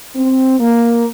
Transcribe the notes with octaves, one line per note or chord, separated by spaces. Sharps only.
C4
A#3